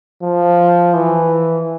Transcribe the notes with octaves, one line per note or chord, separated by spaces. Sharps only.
F3
E3